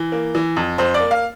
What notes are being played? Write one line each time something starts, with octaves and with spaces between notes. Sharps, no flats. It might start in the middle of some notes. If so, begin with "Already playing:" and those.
Already playing: E3
A#3
E3
F2
F2 C5
D5
A#3
F5